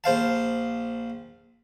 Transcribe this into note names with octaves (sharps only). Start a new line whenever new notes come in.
A#1 C5 F5 A5